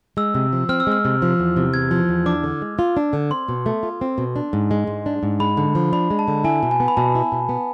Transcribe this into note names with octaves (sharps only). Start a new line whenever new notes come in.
G#3 E6
C3
F3
C4 F6
E6
G#3 F6
C3
F3
E2
C3
E2 G#6
F3
E2
D4 D6
D3
G#3
F4
D4
D3
C4 C6
B2
A3
F4
C4
B2
D4
G#2
G#3
G#2
D4
G#2
G#3 B5
D3
F3
D4 B5
G#3
A5
D3
E4 G#5
B2
G#5
B3
B5
B2 A5
E4
B2
B3